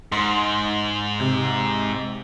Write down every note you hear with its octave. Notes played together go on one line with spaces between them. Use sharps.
G#2 C6
C3